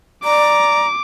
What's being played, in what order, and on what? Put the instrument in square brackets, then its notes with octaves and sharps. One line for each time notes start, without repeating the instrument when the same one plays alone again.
[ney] D5 [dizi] A#5 [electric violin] D6